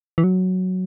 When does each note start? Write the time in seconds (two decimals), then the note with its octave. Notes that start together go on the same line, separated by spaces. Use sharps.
0.18 E3
0.24 F#3